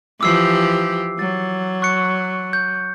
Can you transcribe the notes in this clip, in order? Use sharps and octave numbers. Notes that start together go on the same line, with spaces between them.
E3 F3 G4 D6 E6 C7
F#3 A6
C#6 F#6 C#7
G6